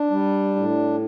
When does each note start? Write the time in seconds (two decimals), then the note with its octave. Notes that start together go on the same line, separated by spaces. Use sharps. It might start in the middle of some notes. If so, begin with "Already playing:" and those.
Already playing: D4
0.11 G3
0.56 A2